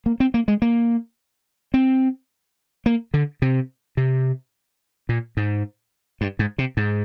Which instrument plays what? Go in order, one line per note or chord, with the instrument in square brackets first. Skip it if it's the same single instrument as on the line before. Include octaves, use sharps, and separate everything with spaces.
[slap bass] A#3
C4
A#3
G#3
A#3
C4
A#3
D3
C3
C3
A#2
G#2
G2
G#2
C3
G#2